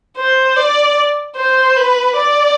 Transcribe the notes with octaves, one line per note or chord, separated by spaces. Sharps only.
C5
D5
C5
B4
D5